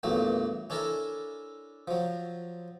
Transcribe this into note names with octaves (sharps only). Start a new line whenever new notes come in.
E2 G2 A#2 F#3 A3
C#4 D4 E4 A4 A#4
F3 F#3